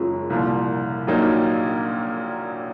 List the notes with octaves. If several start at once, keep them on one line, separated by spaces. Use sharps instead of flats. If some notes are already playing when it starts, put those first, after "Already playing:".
Already playing: F#1 F#2 C#3 G#3 F4
C2 A#2 F3
A#1 A#2 F#3 A#3 D#4